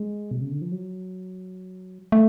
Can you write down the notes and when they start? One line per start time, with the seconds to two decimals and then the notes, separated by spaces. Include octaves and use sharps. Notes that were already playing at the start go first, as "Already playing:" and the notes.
Already playing: G#3
0.31 B2
0.41 C#3
0.52 D3
0.62 F3
0.72 F#3
2.12 A3